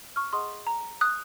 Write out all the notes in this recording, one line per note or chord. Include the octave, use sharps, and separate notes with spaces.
C#6 F6
G#4 D#5 F#5 C6 D#6
A#5
D#6 F#6